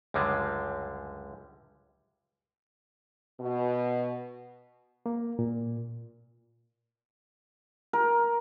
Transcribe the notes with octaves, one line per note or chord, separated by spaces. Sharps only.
C#2 F#2 D3 G3 G#3
B2
A#3
A#2
A#4